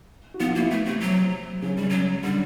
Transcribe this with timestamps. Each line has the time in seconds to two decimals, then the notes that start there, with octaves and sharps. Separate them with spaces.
0.34 F#4
0.40 F3 B3 F4
0.50 F3 F4
0.56 A#3
0.60 E3 E4
0.71 A3
0.86 C3 A3 C4
1.02 F#3
1.62 C#3 F#3 C#4
1.76 C#3 G3 C#4
1.90 F#3
2.24 D3 G3 D4